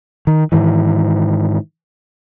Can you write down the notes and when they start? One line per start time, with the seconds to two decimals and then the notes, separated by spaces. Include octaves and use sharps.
0.27 D#3
0.52 G#2 D#3 E3